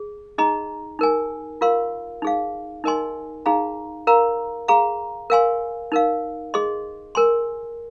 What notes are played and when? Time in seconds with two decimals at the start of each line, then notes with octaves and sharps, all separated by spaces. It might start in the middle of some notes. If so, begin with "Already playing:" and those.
Already playing: G#4
0.38 D#4 G#4 D#5 A#5
0.99 D#4 A#4 G#5
1.61 F4 A#4 F5 C6
2.22 D#4 G#4 F5
2.84 D#4 A#4 D#5 G#5 C6
3.46 D#4 G#4 F5 A#5
4.07 A#4 F5 A#5
4.68 G#4 F5 A#5
5.30 A#4 F5 G#5 C6
5.92 D#4 A#4 F5
6.54 G#4 D#5 C6
7.15 A#4 G#5 C6